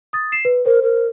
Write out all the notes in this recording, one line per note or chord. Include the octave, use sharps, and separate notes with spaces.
D#6 A6
C7 E7
B4
A#4 C5
A#4